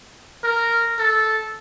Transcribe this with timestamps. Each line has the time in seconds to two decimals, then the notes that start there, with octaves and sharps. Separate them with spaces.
0.44 A#4
0.99 A4